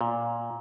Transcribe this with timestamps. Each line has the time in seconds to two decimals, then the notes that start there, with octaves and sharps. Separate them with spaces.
0.01 A#2